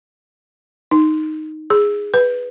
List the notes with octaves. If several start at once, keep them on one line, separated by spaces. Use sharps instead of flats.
D#4
G#4
B4